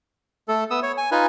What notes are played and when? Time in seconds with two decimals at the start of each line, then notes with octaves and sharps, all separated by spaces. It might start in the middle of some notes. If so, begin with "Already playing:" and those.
0.48 A3 A4
0.71 B3 D#6 E6
0.83 C#5
0.97 G#5
1.12 D#4 F4 B4 G#5